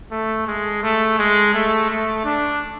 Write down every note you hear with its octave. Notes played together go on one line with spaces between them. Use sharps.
A3
G#3
A3
G#3
A3
A3
D4